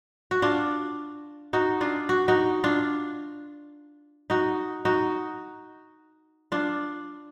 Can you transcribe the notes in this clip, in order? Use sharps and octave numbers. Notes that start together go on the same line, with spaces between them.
F#4
D4 F4
D#4 F#4
D4 F4
F#4
D#4 F#4
D4 F4
D#4 F#4
D#4 F#4
D4 F4